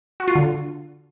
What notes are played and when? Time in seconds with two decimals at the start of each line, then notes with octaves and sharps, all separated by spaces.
0.20 F#4
0.28 F4
0.35 D3